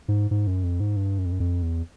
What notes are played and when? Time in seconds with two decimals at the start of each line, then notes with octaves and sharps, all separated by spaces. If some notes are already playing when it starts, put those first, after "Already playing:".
0.08 G#2
0.31 G#2
0.47 F#2
0.64 F2
0.80 G#2
0.96 G2
1.18 F#2
1.25 F2
1.32 F#2
1.40 F2
1.62 E2